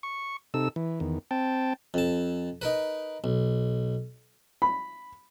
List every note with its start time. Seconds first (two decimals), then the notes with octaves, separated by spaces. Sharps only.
0.03 C#6
0.54 C3 D#4 A4 E6
0.76 E3
1.00 E2 D#3
1.31 C4 G5 A5
1.94 F2 A5
2.62 D#4 A#4 B4
3.24 B1
4.62 B5